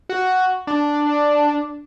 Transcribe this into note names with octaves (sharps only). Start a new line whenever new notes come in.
F#4
D4